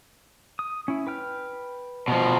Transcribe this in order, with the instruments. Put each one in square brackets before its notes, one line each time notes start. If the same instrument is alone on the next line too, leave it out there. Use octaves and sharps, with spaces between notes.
[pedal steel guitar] D#6
C#4 E4
B4 G5 F6
[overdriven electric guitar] B2 F3